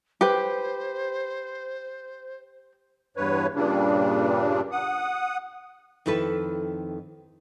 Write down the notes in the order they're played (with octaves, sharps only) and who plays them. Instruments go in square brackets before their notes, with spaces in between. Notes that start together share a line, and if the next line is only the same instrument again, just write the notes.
[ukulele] G4 B4 [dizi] C5
[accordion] E2 G2 B4 C#5
G2 A#2 C#3 G3 D4
F#5 D#6
[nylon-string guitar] F2 D#3 E4 A4 B4